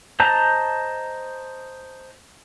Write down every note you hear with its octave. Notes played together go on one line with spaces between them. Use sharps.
C5 D#5 A5 A#5 G6